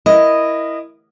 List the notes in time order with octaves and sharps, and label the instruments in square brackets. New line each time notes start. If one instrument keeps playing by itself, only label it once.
[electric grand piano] E4 A#4 [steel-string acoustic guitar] D#5